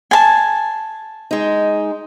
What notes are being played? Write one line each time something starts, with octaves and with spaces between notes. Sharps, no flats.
G#5 A5
G#3 D#4